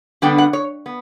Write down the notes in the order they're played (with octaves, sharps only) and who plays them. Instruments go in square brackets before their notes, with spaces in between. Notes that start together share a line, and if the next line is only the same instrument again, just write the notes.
[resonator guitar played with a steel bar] D3 G3 B3 D4 G5
F#5
C#5
B3